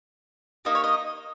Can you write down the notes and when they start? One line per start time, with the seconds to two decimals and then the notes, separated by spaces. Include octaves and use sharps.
0.65 A#3 D#4 G4 D#5
0.75 C#5
0.84 D#5